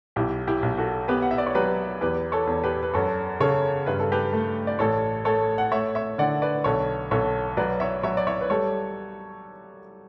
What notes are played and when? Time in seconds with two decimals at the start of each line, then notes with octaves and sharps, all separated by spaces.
0.16 B1 E4 G4
0.47 E4 G4
0.63 B1
0.78 F#4 A4
1.08 B3 G4 B4
1.22 F#5
1.31 E5
1.38 D5
1.46 C#5
1.55 F#3 G4 B4
2.01 E2 G4 B4
2.32 A4 C#5
2.47 E2
2.64 G4 B4
2.83 B4
2.94 F#2 A4 C#5
3.40 C#3 A4 C#5
3.87 G2 B4
3.99 A4
4.12 G4 B4
4.33 A3
4.67 D5
4.79 A1 A4 C#5
5.25 A3 A4 C#5
5.58 F#5
5.72 A3 C#5 E5
5.95 C#5 E5
6.18 D3 D5 F#5
6.42 B4 D5
6.64 B1 A4 C#5
7.11 B1 A4 C#5
7.57 F#3 B4 D5
7.80 C#5 E5
8.03 F#3 C#5 E5
8.17 D5
8.27 C#5 E5
8.41 B4
8.50 G3 A4 C#5